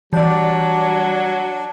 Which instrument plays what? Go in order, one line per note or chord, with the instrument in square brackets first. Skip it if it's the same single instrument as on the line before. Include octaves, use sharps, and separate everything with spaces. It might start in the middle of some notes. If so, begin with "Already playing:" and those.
[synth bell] E3 G6 [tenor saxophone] F#3 [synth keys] G3 D5 [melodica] D4